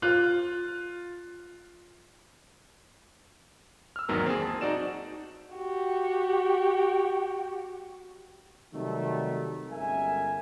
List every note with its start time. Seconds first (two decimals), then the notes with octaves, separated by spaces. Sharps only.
0.02 F4 F6 F#6
3.96 E6 F6
4.09 G#1 E2 D#3 F#3 A#3 A#4
4.26 C4 G#4
4.42 A5
4.61 D#4 F#4 D5 E7
5.55 F#4 G4
8.74 C3 D#3 F#3 G3 A3
9.72 G1 G#3 C#4 A#4 E5 G#5